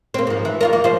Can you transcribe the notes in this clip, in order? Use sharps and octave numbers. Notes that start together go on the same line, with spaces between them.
A#3 C4
G#2 F3
E3
F2 F4 A#4
A#3
F3 C5